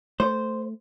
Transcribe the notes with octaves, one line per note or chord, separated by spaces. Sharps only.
A3 C5